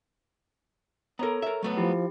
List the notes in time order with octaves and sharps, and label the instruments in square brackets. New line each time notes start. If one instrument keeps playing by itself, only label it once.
[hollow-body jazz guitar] B3 A#4 [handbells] A4 C#5 A#5
[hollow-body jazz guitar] A#4 E5
F#3 A3 B3
[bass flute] F3 [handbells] E4 G4